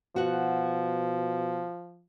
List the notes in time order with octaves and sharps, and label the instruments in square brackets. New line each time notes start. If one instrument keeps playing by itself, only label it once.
[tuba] B2 [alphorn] F3 [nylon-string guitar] F#4 F#5